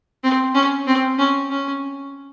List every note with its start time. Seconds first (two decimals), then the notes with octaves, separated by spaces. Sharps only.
0.24 C4
0.55 C#4
0.87 C4
1.18 C#4
1.50 C#4